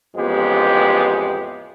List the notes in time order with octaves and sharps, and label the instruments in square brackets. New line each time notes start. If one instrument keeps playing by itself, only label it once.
[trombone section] A1 F2 G#3 B3 G4